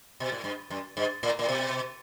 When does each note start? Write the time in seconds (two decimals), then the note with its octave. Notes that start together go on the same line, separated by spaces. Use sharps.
0.20 B2
0.32 A2
0.44 G2
0.70 F#2
0.97 G2
1.23 A2
1.39 A2
1.49 B2